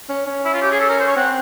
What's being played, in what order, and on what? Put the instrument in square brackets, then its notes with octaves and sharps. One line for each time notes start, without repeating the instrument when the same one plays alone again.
[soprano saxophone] C#4
C#4
[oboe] E4
F4
G4
G#4
A4
A#4
C5
C#5
[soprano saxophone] C4 [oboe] F#5